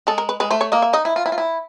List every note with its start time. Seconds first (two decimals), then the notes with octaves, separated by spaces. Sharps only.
0.07 G#3 A4
0.18 A#4
0.29 B4
0.40 G#3 B4
0.50 A3 C5
0.61 C#5
0.72 A#3 D#5
0.82 E5
0.93 D#4 D#5
1.05 E4
1.16 F4
1.26 E4
1.32 F4
1.38 E4